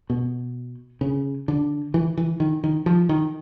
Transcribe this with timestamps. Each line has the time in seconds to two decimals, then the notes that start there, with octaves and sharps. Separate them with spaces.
0.10 B2
1.01 C#3
1.48 D3
1.94 E3
2.17 E3
2.40 D#3
2.64 D#3
2.86 F3
3.09 D#3